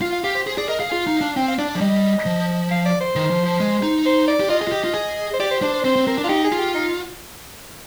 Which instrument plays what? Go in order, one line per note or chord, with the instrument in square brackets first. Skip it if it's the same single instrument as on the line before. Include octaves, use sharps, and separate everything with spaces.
[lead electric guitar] F4 [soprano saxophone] F5
[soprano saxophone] F5
[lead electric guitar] G4 [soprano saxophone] F5
[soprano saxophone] C5
[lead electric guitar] G#4 [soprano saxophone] C5
[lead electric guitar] G#4 [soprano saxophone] D5
[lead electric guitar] A#4 [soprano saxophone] D#5
[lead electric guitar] G#4 [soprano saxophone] F5
[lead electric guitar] F4
D#4
D4
[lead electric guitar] C4 [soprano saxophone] G5
[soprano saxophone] F5
[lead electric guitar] D4 [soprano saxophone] D5
[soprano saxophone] D5
[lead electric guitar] F3
[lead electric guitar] G3 [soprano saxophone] D#5
[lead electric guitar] F3
[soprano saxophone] F5
D5
C5
[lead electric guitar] D#3
F3
F3
G#3
D#4
[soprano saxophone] C5
D5
[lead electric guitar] G4
[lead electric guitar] F4 [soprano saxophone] D#5
[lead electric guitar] G#4
F4
G4
F4
G#4
[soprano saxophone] C5
[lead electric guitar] G4 [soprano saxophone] D5
[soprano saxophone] C5
[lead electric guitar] D4 [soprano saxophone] C5
[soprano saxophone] C5
[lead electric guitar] C4 [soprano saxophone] C5
[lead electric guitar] C4
[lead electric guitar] C4 [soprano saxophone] A#4
[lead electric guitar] D4
[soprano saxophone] F4
[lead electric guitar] D#4 [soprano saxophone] G4
[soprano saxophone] G#4
[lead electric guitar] F4
[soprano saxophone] G4
D#4